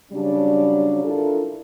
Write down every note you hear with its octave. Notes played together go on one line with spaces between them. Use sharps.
C#3 F#3 G3 D4
D4 E4 F4 A4 A#4